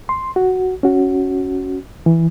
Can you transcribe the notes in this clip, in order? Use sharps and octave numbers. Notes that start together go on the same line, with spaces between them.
C6
F#4
C#4 F#4
E3